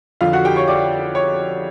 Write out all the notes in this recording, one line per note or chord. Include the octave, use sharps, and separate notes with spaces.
F2 D3 F4 F5
F#4 F#5
G4 G5
C#5 C#6
D5 D6
C#5 C#6